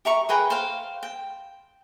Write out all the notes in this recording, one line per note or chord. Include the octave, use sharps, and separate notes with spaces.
G4 E5 A#5 C#6
G#4 B4 G5 A#5
C5 F5 G5
G5